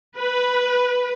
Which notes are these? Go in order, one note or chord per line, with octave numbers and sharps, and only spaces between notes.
B4